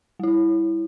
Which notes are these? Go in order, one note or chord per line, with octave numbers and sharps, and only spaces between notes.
G3 E4